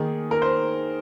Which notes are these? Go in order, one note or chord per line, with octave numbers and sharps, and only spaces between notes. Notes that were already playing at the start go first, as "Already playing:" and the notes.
Already playing: D#3 A#3 G#4
A#4
C5